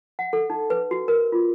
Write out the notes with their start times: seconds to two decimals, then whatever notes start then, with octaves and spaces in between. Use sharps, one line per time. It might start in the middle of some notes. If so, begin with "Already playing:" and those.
0.19 F#5
0.33 A4
0.50 D#4
0.70 B4
0.91 F#4
1.08 A#4
1.32 F4